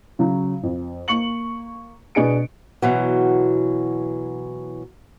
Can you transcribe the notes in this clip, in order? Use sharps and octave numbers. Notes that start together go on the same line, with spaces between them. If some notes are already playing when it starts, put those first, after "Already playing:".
C#3 F#3
F2
A#3 C#6 C#7 F#7
B2 B3 D4 G#4 C#7 D7
B2 E3 F#3